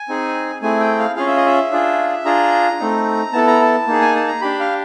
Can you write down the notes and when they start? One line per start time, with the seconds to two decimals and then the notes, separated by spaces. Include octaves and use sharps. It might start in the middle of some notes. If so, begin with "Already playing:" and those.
Already playing: G#5
0.08 C4 D#4 G#4
0.62 A3 C4 E4 G#4 G#5
0.80 G5
0.99 F5
1.16 C#4 F4 G#4 F5
1.27 E5
1.37 D#5
1.46 E5
1.71 D4 F4 G#4
2.25 D4 F4 G#4 A#5
2.79 A3 C4 D#4
3.33 B3 E4 A4 A5
3.47 A#5
3.61 A5
3.87 A#3 D#4 G#4
4.01 G#5
4.15 A5
4.28 A#5
4.41 D4 G4 B5
4.60 F5